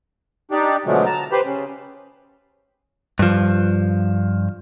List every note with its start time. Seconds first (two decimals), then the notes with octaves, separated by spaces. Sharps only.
0.51 D4 D#4 G4 D5
0.86 B2 D3 F3 F#3 G#3 A3
1.06 A5 A#5
1.32 G4 B4 C5 B5
1.44 C#3
3.19 G2 F3